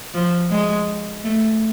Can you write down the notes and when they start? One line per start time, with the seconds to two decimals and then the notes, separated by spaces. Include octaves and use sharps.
0.14 F3
0.50 G#3
1.24 A3